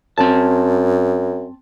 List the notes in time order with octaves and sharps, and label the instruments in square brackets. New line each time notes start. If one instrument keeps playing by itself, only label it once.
[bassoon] F#2 [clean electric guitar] C4 A5